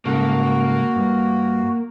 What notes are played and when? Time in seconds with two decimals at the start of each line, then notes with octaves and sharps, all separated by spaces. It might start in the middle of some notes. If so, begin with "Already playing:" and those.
0.05 G#2 C#3 A#3 F#4 A4
0.96 G2